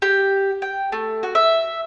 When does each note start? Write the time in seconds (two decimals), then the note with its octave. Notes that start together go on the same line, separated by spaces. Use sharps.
0.02 G4
0.62 G5
0.92 A3
1.23 F#4
1.35 E5